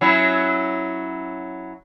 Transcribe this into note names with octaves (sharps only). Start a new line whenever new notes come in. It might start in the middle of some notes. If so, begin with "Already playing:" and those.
F#3 C#4 E4